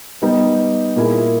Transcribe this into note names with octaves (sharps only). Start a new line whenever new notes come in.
G3 B3 D#4 G4
A#2 A#3 E4 G#4